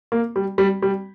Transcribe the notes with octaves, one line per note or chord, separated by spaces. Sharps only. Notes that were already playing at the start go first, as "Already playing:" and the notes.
A#3
G3
G3
G3